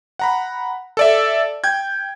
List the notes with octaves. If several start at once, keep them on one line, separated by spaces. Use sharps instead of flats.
F#5 A#5 B5
A4 D5 E5
G5 G6 G#6